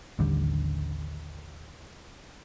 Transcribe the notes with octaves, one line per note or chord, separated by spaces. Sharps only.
A1 D#2 D3 G3